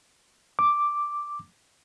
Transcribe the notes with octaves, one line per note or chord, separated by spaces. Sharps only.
D6